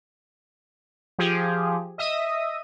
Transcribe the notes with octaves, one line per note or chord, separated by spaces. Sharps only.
F3 G4 G#4
D#5 E5 D#6